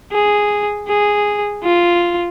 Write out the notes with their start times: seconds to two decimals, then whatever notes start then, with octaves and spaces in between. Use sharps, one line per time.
0.12 G#4
0.88 G#4
1.64 F4